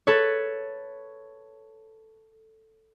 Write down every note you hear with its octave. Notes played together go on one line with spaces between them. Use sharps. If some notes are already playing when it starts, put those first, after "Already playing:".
A4 B4 C#5